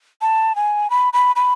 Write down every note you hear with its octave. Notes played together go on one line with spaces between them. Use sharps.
A5
G#5
B5
B5
B5